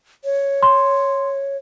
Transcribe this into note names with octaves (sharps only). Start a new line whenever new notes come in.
C#5
C6